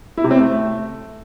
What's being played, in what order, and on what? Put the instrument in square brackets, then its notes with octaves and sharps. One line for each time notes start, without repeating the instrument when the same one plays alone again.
[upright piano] E4
C3
C4
A3